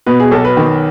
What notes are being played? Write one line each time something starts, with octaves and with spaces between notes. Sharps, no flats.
B2 B4
G#4
B1 A4
B4
D#3